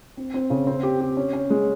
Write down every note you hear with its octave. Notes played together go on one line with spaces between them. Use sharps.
C4
C4
C#3
C4
G4
G4
C#4
C#4
G#3